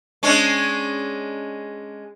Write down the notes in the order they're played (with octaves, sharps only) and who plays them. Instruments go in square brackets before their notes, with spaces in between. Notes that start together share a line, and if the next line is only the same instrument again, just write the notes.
[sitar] G#3 C#4 D4